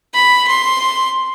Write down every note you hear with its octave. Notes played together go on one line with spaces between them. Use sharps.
B5
C6